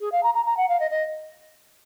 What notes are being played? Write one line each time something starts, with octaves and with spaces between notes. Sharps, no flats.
G#4
F5
A#5
A#5
A#5
F#5
F5
D#5
D#5